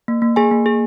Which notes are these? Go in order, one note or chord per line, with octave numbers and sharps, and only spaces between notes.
A#3
A#3
A#3 G#4 G#5
A#3
G#4